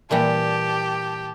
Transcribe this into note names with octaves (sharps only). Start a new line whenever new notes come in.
A#2 E3 G3 G4 A5